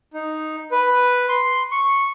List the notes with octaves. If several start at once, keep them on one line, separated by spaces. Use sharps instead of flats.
D#4
B4
C6
C#6